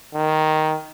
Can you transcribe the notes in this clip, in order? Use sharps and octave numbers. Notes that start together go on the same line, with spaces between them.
D#3